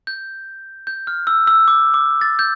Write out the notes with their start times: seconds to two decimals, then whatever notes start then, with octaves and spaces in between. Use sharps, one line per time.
0.07 G6
0.87 G6
1.07 F6
1.27 E6
1.47 E6
1.68 D6
1.94 D6
2.21 A6
2.39 G6